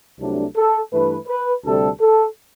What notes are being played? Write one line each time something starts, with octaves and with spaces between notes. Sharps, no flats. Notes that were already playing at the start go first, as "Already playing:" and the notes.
C2 C3 F#3 A3 D4
A4
G2 E3 A3 B4
B4
D2 C3 G3 A4
A4